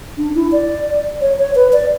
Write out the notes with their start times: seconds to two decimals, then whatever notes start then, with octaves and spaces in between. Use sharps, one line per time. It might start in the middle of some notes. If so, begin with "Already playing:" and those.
0.18 D4
0.35 E4
0.52 D5
1.21 C#5
1.39 C#5
1.55 B4
1.73 D5